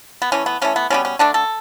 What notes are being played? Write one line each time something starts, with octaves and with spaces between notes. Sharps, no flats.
B3
E3 A3 C#4
B3
E3 A3 C#4
B3
B2 G3 B3 C#4
C#4
D3 A3 D4
A4